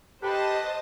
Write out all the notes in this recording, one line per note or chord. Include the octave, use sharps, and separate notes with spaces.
G4 A4 B4 C5 D#5 G5 A5 B5